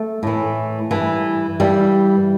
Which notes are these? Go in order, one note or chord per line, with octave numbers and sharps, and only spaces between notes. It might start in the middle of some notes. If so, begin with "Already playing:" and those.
Already playing: A3
A2 E3
G2 E3
G2 E3 G3